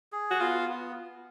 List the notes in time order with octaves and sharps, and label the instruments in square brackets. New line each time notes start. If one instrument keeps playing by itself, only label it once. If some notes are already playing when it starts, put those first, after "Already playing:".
[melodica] G#4
[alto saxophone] F#4
[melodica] B3 [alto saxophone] F4
[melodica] B3